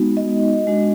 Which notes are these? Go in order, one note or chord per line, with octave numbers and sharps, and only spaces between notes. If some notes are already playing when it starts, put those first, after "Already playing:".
Already playing: G#3 B3 D#4 F#4
D#5
G#3 D4 F#4